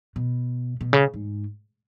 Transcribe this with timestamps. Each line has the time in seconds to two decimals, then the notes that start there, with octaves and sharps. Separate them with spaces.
0.16 B2
0.81 B2
0.93 C#3
1.14 G#2